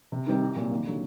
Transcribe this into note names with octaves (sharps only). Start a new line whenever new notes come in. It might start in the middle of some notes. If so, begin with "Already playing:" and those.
C3
D#3 G3 C4
C2
A#2 F#3
D#2
D3 F#3